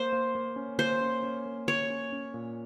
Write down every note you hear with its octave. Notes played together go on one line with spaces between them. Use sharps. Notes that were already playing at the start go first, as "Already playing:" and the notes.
Already playing: A#3 C5
A#3
A#3
C#4
A#3 C5
C#4
C#4
A#3
A#3 C#5
C#4
C#4
A#2